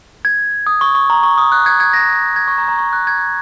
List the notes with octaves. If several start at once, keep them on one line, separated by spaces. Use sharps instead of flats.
G#6
D#6
C#6
C#6
A#5
C#6
D#6
F#6
G#6
G#6
A#6
G#6
C#6
A#5
A#5
C#6
F#6
G#6